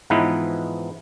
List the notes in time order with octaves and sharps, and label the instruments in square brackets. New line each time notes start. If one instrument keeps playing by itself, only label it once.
[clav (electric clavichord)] G#2 E3 F3 B3 D#4 E4